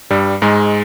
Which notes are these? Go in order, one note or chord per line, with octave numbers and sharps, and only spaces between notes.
G2 G3
G#2 G#3